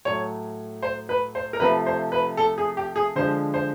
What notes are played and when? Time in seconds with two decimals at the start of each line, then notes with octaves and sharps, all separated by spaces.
0.05 A2 F#3 A3 C#5
0.83 C5
1.09 B4
1.35 C5
1.53 A#4
1.60 C3 F3 A3 B4
1.86 C5
2.12 B4
2.37 A4
2.58 G#4
2.77 G4
2.96 G#4
3.16 D3 F3 G#3 C5
3.54 C5